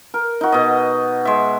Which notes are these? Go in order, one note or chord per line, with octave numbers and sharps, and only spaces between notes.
A#4
D#4 F#4
B2 D#5
G#3 E5